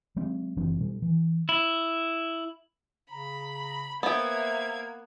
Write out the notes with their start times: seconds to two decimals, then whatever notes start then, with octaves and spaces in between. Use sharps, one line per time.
0.16 F#3 G#3 C4
0.57 F#1 E3 C4 D4
0.80 B2 G3
1.02 E3
1.49 E4
3.11 C#3 A#5 B5
4.03 A#3 B3 C5 E5 G5 G#6